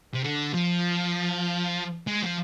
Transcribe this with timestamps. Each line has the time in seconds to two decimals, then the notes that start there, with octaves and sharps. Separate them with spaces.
0.14 C3
0.23 D3
0.54 F3
2.07 G#3
2.22 F3